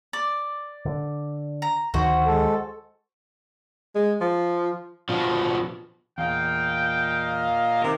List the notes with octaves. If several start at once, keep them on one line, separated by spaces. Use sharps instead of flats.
D5
D3
A#5
D2 D#3 F3 F#4 C5
G#3 A4
G#3
F3
B2 F3
E2 A#2 D#5 F5 G5
C3 D#3 A#4